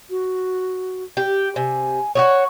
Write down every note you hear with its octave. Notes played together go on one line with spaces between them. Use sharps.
F#4
G4
C3 G#5
F#4 G#4 C#5 C#6